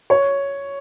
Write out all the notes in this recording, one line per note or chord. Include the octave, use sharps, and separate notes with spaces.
C#5